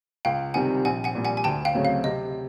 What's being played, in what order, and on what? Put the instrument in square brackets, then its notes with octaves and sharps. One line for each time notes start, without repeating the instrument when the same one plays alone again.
[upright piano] C#2 [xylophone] F5 G5
[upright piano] C3 D#3 G3 C4 [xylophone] F#5 G#5
[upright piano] A#1 [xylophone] F#5 G#5
[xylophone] F#5 G#5
[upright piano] A#2 G3
[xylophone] F#5 G#5
G#5
[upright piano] D2 [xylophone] G5 A5
[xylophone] F5 G5
[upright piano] C#3 F#3 A3 C4
[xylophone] F5
[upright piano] C3 [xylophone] D#5